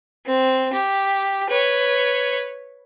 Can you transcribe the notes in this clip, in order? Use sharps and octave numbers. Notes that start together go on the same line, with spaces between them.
C4
G4
B4 C#5